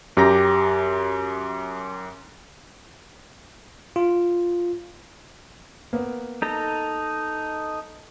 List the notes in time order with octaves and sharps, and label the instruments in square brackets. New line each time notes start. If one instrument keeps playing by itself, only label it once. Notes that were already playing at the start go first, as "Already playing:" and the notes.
[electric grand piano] F#2 G4 A#5 A#6
[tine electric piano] F4
[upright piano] A#3 B3
[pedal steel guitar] D#4 A4 A#5